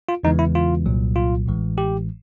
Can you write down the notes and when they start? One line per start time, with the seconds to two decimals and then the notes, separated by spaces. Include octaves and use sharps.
0.09 F4
0.23 E2 C#3 E3 G#3 B3 D#4
0.39 E4
0.55 F4
0.86 C2 A#2 F#3
1.16 F4
1.46 A1 A2 E3 G#3
1.78 G4